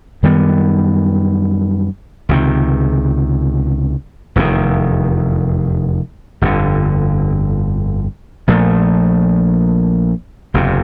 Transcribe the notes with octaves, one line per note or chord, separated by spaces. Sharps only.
F#2 D#3 G3 B3
C#2 C3 D#3
F1 E2 C3 D#3
G1 F2 D3
A#1 A#2 F3 A3
F#1 E2 C3